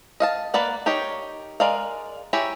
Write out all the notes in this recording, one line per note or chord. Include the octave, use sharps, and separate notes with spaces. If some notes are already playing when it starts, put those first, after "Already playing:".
D#5 F5 A5
A#3 B4 D5 F#5
D#4 G4 A#4 C#5
G#3 A#4 D5 D#5 F5
E4 G4 G#4 C#5 A#5